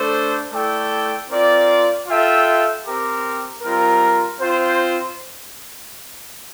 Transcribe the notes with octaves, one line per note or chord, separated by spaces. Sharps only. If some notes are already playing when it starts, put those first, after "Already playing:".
Already playing: A3 D4 A4 C5
A3 E4 A4 D5 G5
C4 F4 A#4 D5
F4 A4 E5 G5
C4 G4 A#4
G3 C4 F4 A#4
C4 F4 C5